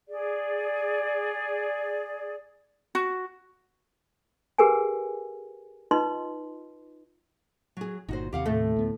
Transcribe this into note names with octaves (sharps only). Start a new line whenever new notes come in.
G#4 D5
F#4
G4 G#4 A#4 B4 F#5 G#5
D#4 F4 B4 D#5 C6
F#3 G#4
G1 A#2 D#4 F#4 C5
D#2 C3 G4 F5 F#5
A2 A3
D2 B3